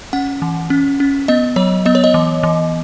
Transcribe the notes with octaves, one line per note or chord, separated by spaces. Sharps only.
C#4 F#5
E3
C#4
C#4
B3 D#5
F#3 C#5
B3 D#5
C#5
D#5
E3
E3